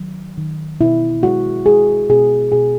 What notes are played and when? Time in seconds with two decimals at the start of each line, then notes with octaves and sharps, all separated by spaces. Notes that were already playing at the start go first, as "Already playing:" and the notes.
Already playing: D#3 F#3
0.37 D#3
0.80 B2 E4
1.23 G#3 F#4
1.66 G#3 G#4
2.09 B2 G#4
2.52 B2 G#4